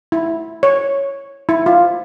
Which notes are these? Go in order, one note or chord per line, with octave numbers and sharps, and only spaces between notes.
E4
C#5
E4
F4